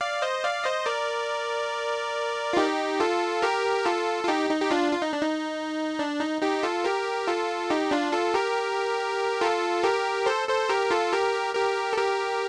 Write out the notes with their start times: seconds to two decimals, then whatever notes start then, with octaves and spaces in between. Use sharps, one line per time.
0.01 D5 F5
0.22 C5 D#5
0.44 D5 F5
0.64 C5 D#5
0.86 A#4 D5
2.53 F4
2.57 D#4 G4
3.00 F4 A4
3.42 G4 A#4
3.85 F4 A4
4.23 F4
4.28 D#4 G4
4.50 D#4
4.61 G4
4.71 D4 F4
4.92 F4
5.02 D#4
5.13 D4
5.22 D#4
5.99 D4
6.20 D#4
6.42 D#4 G4
6.63 F4 A4
6.84 G4 A#4
7.27 F4 A4
7.70 D#4 G4
7.91 D4 F4
8.13 F4 A4
8.34 G4 A#4
9.41 F4 A4
9.83 G4 A#4
10.26 A4 C5
10.48 A4 C5
10.69 G4 A#4
10.91 F4 A4
11.12 G4 A#4
11.55 G4 A#4
11.93 A4
11.97 G4 A#4